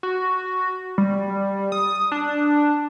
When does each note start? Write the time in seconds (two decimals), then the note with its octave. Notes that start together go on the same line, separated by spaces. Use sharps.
0.03 F#4
0.98 G3
1.72 D#6
2.12 D4